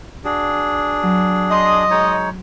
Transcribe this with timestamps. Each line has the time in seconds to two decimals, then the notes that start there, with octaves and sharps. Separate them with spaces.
0.25 D4 F#4 G#4
1.03 F#3
1.51 D#5 C6
1.91 G#3 D#4 C#5